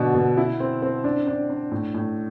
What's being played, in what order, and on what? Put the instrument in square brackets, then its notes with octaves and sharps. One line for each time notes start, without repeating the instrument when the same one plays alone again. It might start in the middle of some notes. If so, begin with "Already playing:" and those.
Already playing: [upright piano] B2 D3 D4
B2
E4
C4
C4
D4
D4
D4
A2
A2